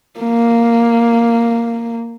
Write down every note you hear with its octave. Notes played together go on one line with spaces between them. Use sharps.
A#3